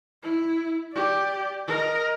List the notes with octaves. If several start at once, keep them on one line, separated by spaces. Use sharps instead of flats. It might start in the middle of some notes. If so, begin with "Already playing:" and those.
E4
G4 D5
A#4 D#5